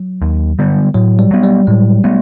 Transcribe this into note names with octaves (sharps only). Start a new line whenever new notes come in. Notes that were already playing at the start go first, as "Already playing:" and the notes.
Already playing: F#3
D#2
D3 G3 B3
A2 F#3
G3
F#3 B3
G3
A2 G#3
F#3 A3 B3